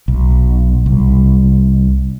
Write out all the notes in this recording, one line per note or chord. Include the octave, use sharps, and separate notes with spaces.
B1
C2